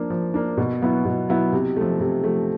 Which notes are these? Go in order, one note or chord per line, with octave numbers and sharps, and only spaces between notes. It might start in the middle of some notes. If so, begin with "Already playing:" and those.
Already playing: F3 A#3 D4
F3
A#3 D4
B2
F#3 B3 E4
B2
F#3 B3 E4
C3
F3 A3
C3
F3 A3